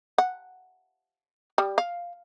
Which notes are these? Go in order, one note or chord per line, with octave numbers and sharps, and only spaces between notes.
F#5
G3
F5